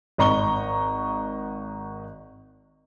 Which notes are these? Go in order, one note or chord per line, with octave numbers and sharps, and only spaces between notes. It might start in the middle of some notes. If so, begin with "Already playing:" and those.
G#1 D#5 A#5 C#6 G7